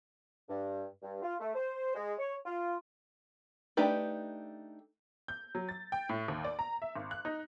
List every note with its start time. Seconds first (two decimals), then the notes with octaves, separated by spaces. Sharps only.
0.49 G2
1.03 G2
1.22 F4
1.40 A3
1.55 C5
1.95 G#3
2.18 C#5
2.45 F4
3.77 A3 D4 D#4 G4 B4
5.28 G6
5.55 F#3
5.69 A6
5.92 G5
6.09 A2
6.28 D#2
6.45 D5
6.59 A#5
6.82 E5
6.96 G#1
7.11 F#6
7.25 D#4